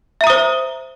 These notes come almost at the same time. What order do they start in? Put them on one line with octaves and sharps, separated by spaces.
E5 A#5 D#6 C5